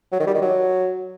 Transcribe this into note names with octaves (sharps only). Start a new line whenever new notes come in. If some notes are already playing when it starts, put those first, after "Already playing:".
F#3
D#3
G3
D#3
F#3